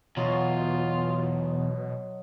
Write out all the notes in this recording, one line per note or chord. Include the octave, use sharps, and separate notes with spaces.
E2 B2 F#3 F4 D#5 C6